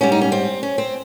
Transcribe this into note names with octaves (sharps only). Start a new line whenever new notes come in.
G#2 G3 C#4
D#4
C#4
C4
C#4
C4